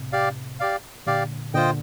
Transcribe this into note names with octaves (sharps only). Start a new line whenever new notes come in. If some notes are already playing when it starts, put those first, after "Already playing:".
Already playing: A2 C3
G4 D5 F5
G4 D5 F5
A#2 D3 G4 D5 F5
A#2 D3 F4 C5 D#5 G5